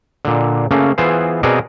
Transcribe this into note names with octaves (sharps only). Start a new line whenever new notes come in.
A#2 D3
C#3 A3 A#3 C#4
E3 B3 F4 G#4 C5
B2 C4 G#4 A#4 D5 F#5